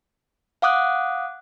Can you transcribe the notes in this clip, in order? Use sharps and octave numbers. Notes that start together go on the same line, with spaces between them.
F5 F#5 D6 D#6 F#6